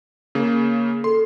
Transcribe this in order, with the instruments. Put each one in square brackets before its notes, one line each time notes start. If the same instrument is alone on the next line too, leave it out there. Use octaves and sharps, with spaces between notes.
[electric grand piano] C#3 A#3
[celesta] A4 [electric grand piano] C6